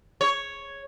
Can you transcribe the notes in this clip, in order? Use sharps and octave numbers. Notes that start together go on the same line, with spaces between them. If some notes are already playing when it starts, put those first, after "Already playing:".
C#5